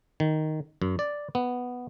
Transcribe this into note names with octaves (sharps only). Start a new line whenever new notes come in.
D#3
F#2
D5
B3